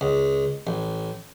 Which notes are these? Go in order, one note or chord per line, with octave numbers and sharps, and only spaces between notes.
C#2
A1